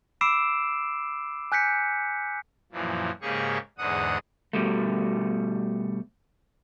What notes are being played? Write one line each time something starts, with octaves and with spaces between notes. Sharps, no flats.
B5 D6 E6 C7 D7 E7
G#5 F#6 G6 B6 C#7
F#2 A#2 E3 F3
G#2 C#3 A#3 G4 G#4 C#6
E2 G#2 D3 F#5 D#6
B2 G3 A3